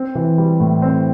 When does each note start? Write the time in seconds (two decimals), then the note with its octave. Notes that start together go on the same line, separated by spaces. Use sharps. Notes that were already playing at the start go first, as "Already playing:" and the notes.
Already playing: C4
0.15 E3
0.38 G3
0.60 A2
0.82 C4